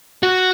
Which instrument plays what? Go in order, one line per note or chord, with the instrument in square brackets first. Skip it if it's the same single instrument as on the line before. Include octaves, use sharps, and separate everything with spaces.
[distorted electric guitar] F#4